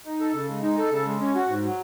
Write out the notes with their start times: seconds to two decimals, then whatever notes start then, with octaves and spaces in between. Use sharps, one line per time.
0.05 D#4
0.20 A4
0.34 C#3
0.49 G#3
0.63 D#4
0.77 A4
0.91 C#3
1.06 G#3
1.20 C#4
1.35 F#4
1.48 G#2
1.63 F#3